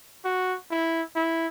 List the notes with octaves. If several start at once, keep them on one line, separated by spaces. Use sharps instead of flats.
F#4
E4
E4